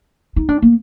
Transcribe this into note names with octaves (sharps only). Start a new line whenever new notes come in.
D#4
D4
A#3